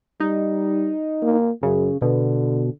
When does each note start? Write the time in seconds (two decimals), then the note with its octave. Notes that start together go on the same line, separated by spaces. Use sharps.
0.20 G3 D#4
1.22 A#3
1.63 F#2 C#3
2.02 B2 D3